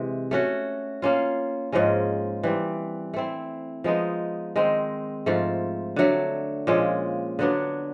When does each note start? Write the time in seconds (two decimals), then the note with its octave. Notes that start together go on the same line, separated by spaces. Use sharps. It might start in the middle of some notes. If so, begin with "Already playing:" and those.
Already playing: C3 E3 G#3
0.31 A3 C#4 F#4
1.02 A#3 C#4 F4
1.72 G#2 F3 G#3 C#4
2.43 E3 G3 C4
3.14 A3 C4 E4
3.84 F3 G#3 B3 D#4
4.56 D#3 G#3 C4
5.26 G#2 F3 A3
5.96 D3 F#3 A3
6.67 A#2 F3 G#3 C#4
7.39 D3 F#3 B3 D4